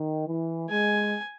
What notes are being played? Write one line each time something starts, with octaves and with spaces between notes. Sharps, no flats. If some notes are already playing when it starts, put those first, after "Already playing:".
Already playing: D#3
E3
G#3 G#5